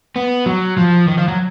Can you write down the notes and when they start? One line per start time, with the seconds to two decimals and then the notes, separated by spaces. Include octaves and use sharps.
0.16 B3
0.46 F#3
0.77 F3
1.07 D#3
1.18 F3
1.28 F#3